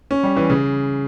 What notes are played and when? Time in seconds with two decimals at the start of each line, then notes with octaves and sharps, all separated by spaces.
0.11 C#4
0.23 G3
0.37 E3
0.50 C#3